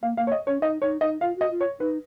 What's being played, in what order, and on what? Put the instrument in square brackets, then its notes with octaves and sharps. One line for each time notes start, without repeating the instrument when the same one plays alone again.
[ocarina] A#3 [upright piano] F5
[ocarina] A#3 [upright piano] F5
[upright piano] C#5
D#5
[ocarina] C#4 [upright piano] C#5
[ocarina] D#4 [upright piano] D#5
[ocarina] D#4 [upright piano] C#5
[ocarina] D#4 [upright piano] D#5
[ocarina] F4 [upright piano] F5
[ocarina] F#4 [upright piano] D#5
[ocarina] F4
[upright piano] C#5
[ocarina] D#4 [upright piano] B4